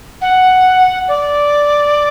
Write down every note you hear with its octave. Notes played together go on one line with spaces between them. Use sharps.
F#5
D5